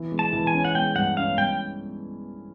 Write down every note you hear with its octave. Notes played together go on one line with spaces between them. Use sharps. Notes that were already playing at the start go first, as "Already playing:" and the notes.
Already playing: E3
G#3
A5
E3
G#5
C#4
F#5
G#3 G5
G2 F#5
C#4 F5
G2 G5